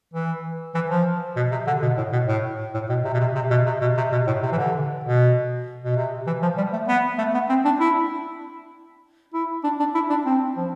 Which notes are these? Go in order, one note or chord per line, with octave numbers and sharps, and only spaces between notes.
E3
E3
F3
B2
C3
D3
B2
A2
B2
A2
A2
B2
C3
B2
C3
C3
B2
C3
B2
C3
B2
A2
C3
E3
D3
B2
B2
C3
E3
F3
G3
A3
B3
A3
B3
C4
D4
E4
E4
D4
D4
E4
D4
C4
F3